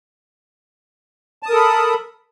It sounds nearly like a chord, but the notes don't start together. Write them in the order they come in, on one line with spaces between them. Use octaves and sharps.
A5 D#6 A#4 A4 B5